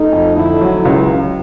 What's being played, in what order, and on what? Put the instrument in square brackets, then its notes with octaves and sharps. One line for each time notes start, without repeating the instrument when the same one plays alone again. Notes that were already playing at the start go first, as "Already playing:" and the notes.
Already playing: [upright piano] A3 [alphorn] D#4
[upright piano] F2
[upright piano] D3 [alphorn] E4
[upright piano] F#3
C#2